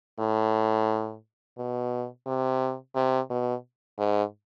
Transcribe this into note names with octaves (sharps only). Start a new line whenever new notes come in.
A2
B2
C3
C3
B2
G#2